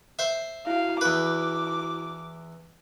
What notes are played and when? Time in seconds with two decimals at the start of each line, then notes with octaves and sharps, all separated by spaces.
0.19 C5 E5
0.67 E4 F#4 F5
1.01 E2 B4 D6